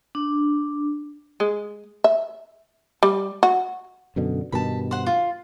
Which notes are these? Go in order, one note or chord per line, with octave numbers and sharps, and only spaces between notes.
D4
G#3
E5
G3
F#4
F#2 B2 D3
G2 B2 D#3 A5 B5
C5 F#5
F4